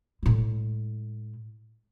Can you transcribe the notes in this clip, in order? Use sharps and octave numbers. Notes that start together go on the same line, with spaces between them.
A2 G#3